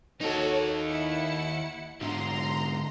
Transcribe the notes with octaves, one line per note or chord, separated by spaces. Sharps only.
D#2 D#4 F#4 A4 C#5
E4 F#5 C#7
G#2 D3 A#5 C6